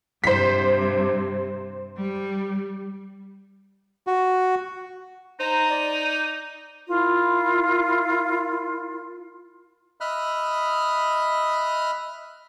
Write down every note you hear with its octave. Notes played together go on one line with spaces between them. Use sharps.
G2 C3 C5 B6
G3
F#4
D#4 C5 A#5
D5
E4 F4 A#4
D#5 E5 B5 D#6 F6 F#6